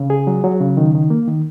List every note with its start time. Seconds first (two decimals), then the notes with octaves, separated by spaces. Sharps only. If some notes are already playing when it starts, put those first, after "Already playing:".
Already playing: C#3
0.10 G#4
0.27 F#3
0.44 F#3
0.61 C#3
0.77 D#3
0.94 D#3
1.10 A#3
1.28 D#3